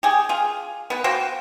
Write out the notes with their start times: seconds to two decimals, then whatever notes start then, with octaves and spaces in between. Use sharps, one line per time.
0.03 G4 G#4
0.29 F4 G#4
0.90 B3 B4
1.04 F#4 C5 F5 G5